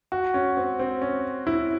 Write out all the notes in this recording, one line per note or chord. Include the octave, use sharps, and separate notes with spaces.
F#4
C#4
C4
C4
C#4
E4